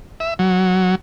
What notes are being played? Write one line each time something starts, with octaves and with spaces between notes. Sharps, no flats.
E5
F#3